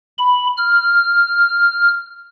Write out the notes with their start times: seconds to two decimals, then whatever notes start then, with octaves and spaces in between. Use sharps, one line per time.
0.18 B5
0.57 F6